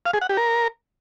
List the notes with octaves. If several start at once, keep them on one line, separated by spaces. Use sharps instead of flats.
F5
G#4
F#5
G4
A#4